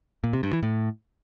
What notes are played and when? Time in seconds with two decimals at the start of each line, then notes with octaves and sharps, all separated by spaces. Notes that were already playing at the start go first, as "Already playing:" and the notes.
0.24 A#2
0.33 C3
0.43 G2
0.53 E3
0.63 A2